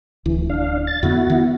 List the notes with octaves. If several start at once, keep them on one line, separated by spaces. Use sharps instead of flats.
D1 D2 E3
D4 F5
A6
F2 D3 B3 E4 F#4
D#3 B3